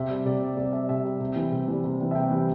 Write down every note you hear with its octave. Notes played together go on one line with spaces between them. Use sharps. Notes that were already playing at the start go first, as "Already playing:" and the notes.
Already playing: C3 E5
G3
C3 D5
G3
C3 D5
G3 E5
C3 E5
G3
C3
E3 G3
C3
E3 G3
C3
E3 G3
E5
C3 G5
E3 G3